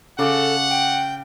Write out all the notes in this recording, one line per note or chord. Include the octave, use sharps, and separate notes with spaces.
C#3 A4 F#5 D6
G5